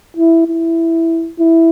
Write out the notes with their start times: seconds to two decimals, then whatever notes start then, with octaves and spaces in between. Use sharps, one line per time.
0.17 E4
0.48 E4
1.40 E4